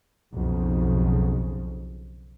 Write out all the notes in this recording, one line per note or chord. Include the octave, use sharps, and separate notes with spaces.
B1 F2 C#3